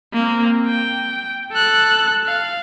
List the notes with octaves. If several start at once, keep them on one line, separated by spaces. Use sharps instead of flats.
A#3 C4
G5
A4 F#6
F5